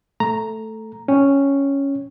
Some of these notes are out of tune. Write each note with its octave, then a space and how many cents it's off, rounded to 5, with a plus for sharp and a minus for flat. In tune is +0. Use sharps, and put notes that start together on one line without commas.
A3 +0 A#5 +0
C#4 +0 C#5 +0 G5 +0